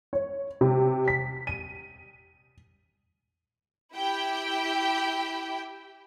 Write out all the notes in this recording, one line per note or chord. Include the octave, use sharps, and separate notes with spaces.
C#5
C3
B6
D#7
E4 G4 G5